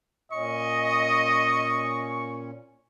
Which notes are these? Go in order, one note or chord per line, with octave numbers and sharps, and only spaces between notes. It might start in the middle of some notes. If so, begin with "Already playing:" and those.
A#2 C#4 D#5 C#6